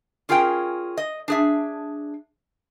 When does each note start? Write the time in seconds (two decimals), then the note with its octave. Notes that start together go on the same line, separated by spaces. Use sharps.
0.29 C#4 F4 G#4 A#4 G5
0.97 D#5
1.28 D4 G#4 E5